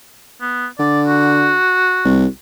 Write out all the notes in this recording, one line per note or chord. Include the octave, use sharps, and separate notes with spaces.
B3
D3 D5
F#4
C2